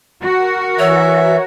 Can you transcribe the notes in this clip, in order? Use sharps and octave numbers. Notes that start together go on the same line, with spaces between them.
F#4 A#4
E3 C#5 E5